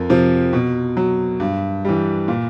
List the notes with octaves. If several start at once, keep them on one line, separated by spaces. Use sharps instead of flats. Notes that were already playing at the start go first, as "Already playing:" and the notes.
Already playing: F2 A#4
C3 F3
B2
F#3
G2
E3 G3
A#2